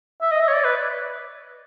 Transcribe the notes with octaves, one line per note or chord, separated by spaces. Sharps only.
E5
D#5
E5
C#5
D5
B4